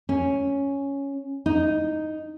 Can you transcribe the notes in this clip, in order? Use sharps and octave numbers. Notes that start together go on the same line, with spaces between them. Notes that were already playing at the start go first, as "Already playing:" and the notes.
C#4
D#4